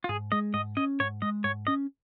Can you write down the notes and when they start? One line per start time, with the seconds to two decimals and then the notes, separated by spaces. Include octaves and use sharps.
0.04 F4
0.09 G#2 G#4
0.32 G#3 D#5
0.54 G#2 D#5
0.77 C#4 D#5
1.00 G#2 C#5
1.22 G#3 D#5
1.44 G#2 C#5
1.67 C#4 D#5